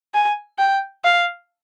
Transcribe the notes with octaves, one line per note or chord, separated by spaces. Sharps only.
G#5
G5
F5